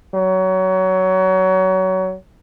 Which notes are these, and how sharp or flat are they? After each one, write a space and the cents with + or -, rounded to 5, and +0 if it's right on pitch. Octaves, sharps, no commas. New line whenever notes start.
F#3 +25